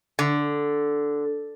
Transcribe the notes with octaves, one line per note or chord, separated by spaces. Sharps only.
D3